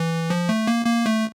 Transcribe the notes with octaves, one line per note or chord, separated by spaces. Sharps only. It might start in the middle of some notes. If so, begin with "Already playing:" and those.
Already playing: E3
F3
A3
A#3
A#3
A3